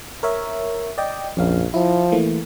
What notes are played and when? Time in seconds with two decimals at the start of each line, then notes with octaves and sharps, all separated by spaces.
0.23 A#4 C#5 E5
0.98 D5 D#5 G5
1.37 A#1 F2 C#4 F5
1.74 F3 E4
2.12 E3 A3 A#3